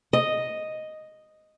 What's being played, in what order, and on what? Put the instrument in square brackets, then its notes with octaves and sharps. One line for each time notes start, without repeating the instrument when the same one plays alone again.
[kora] D#5